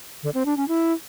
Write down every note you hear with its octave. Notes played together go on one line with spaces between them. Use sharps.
D3
C4
D4
C#4
E4